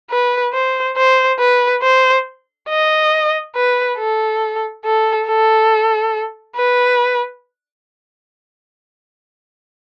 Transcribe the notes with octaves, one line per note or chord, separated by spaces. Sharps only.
B4
C5
C5
B4
C5
D#5
B4
A4
A4
A4
B4